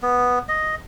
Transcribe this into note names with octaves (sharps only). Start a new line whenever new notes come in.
B3
D#5